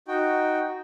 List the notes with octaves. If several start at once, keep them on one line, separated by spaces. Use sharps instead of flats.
D#4 F#4 G5